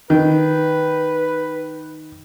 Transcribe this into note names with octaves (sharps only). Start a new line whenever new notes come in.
D#3 B4